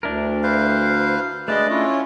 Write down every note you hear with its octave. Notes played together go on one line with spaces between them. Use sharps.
D2 D4 E4 A#4
B4 C5 F5
G#3 A3 D4 B4 D5 D#5
C#4 E4 F4 C#5